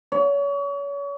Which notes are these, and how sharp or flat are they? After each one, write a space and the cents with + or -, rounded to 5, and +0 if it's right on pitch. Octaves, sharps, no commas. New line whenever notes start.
C#5 +35